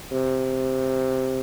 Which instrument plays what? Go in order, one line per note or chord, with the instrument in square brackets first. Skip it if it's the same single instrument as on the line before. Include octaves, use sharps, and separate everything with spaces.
[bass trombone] C3